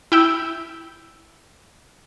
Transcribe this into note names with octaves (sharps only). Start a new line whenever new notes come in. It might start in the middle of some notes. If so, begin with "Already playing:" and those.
E4 G5 E6